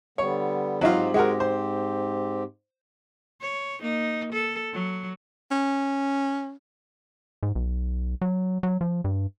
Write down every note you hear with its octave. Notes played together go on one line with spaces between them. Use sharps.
D3 G3 B3 C#5
G#2 F#3 C4 D#4 F4 G4
G#3 F#4 A#4
C5
C#5
A#3 D#4
A4
F#3
C#4
G#2
B1
F#3
F#3
F3
G2